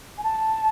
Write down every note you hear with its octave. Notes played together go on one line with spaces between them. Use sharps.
G#5
A5